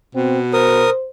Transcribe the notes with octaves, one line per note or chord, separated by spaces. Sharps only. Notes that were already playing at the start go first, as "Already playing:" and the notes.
B2 C4
A#4 C5 D#6